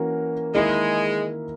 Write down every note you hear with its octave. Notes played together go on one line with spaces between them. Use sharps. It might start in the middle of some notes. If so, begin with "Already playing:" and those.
Already playing: E3 A#3 C#4 F#4 A#4
D#3 G#3 A#3 E4